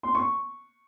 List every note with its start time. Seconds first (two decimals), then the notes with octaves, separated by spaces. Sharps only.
0.03 C6
0.15 C#6